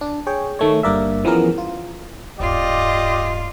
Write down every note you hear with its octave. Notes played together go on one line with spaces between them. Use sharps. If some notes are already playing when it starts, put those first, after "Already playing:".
D4
G#4 C#5 G5
D#3 A3 C#5
G1 G2 A#3 A#4 D5 E5
E3 F3 B3 C#4 G#4 A#4
F4
D1 G2 F4 G4 D5 D#5